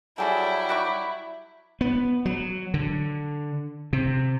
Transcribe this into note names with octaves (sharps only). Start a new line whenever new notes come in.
F#3 G3 E4 F#4 G#4 A4 G5
F#4 D5 C#6
B3
F#3
D3
C3